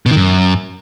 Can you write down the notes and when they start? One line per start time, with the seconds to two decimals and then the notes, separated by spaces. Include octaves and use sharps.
0.06 B2
0.11 D#3
0.16 F#2